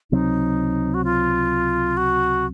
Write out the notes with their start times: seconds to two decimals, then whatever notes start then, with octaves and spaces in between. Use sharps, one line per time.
0.11 C#2 C3 F#3 C4 D#4
0.94 F#4
1.04 F4
1.97 F#4